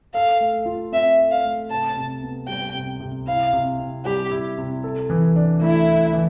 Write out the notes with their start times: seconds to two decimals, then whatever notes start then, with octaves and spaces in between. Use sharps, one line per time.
0.13 A4 F5
0.40 A3
0.66 F4
0.92 C4 E5
1.18 A4
1.31 F5
1.45 A3
1.70 C3 A5
1.96 C3
2.23 B3
2.48 G3 G5
2.74 C3
3.00 C3
3.27 E4 F5
3.53 C3
3.79 C4
4.05 G3 G4
4.31 E4
4.58 C3
4.84 A4
5.10 E3
5.36 D4
5.61 A3 E4
5.88 A4
6.13 E3